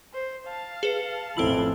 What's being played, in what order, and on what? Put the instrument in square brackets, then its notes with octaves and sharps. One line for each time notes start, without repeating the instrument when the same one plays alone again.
[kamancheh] C5
F5 A5
[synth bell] G#4 B4 C#7
[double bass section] A1 F2 [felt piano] C4 E4 [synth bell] A4 E6 F#7